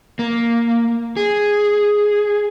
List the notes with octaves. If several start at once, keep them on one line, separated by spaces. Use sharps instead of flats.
A#3
G#4